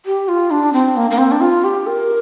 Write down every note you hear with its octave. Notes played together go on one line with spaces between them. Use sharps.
G4
F4
D4
C4
A#3
A#3
C4
D4
F4
G4
A#4